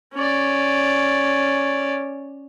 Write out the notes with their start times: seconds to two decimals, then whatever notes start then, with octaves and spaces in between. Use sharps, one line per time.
0.14 C#4 D5